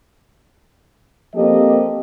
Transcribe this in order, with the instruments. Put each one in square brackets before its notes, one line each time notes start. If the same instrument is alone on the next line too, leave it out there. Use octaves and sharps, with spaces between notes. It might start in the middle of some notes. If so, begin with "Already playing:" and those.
[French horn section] F3 A#3 C4 G4 A4 D#5